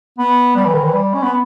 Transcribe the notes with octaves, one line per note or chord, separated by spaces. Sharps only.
B3
G3
E3
D#3
E3
G3
C#4
B3